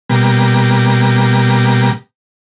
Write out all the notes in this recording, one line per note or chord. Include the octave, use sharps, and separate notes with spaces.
B2 G3 A#3